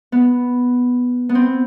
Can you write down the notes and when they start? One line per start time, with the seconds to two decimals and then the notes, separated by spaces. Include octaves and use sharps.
0.12 B3
1.29 B3
1.35 C4